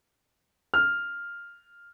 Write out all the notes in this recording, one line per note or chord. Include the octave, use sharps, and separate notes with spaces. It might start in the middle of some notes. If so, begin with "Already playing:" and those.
F6